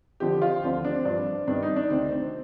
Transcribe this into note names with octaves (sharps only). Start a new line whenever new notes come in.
F2 D3 F3 G4
F4
D2 D3 F3 C4
D4
C4
G2 F3 D4
G2 D#3 D4
D#4
D4
D2 C3 D#3 C4
C4